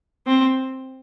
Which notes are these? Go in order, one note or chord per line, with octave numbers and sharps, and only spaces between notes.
C4